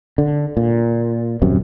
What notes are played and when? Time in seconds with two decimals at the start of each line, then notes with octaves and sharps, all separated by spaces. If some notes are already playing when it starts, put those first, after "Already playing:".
0.18 D3
0.57 A#2
1.42 D#1 F#2 C3